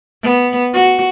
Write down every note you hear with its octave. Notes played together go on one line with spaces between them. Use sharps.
B3
F#4